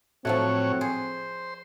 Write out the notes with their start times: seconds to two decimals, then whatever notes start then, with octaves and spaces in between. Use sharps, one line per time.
0.25 A2 F3 F#3 A3 C4 F#4 C#5
0.81 G#4 C5